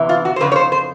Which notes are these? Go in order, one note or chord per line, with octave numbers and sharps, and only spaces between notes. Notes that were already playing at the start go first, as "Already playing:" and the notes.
Already playing: E2 C3 E3
F4
F#4
C5
F2 C#3 B4
C#5
C5
C5